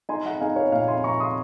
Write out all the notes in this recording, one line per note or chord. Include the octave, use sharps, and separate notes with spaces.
D#4 G#5 C6
F#5 A#5
D#4 F5 G#5
C#5 F5
A#2 F5 G#5
G#5 C6
A#2 A#5 C#6
C6 D#6